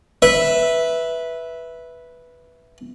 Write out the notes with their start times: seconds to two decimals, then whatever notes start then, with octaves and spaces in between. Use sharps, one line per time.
0.22 B4 E5